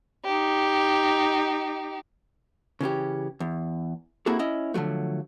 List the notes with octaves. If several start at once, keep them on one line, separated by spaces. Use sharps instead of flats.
D#4 G4
C#3 E3 C#4 G4
E2
A#3 C4 E4 F#4 G#4 A4
C#4 E4 D#5
D3 F3 F#3 A3